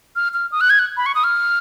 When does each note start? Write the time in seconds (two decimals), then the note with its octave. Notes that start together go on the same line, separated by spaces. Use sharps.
0.16 F6
0.34 F6
0.52 D#6
0.61 F#6
0.70 G#6
0.79 F#6
0.97 B5
1.06 C#6
1.15 D#6
1.24 F6